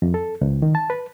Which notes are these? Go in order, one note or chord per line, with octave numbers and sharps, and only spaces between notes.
F2
A4
C#2
D#3
A5
B4